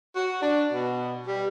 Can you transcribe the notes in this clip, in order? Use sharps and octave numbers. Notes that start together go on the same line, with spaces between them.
F#4
D4
B2
G3